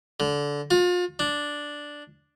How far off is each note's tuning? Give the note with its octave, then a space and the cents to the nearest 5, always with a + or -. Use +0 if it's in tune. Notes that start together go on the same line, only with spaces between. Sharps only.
D3 -20
F4 +35
D4 +0